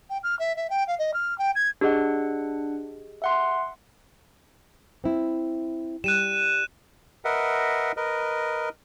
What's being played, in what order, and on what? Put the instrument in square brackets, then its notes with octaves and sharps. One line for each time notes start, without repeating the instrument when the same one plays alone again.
[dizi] G5
F6
E5
E5
G5
F5
D#5
F6
G5
G#6
[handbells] D4 F#5 [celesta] G4 G#4 D#5
[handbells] E5 F#5 C6
[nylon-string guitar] C4 E4
[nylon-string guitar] G3 [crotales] F#6 D#7 E7
[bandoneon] A#4 B4 D#5 E5 F#5
A#4 B4 D#5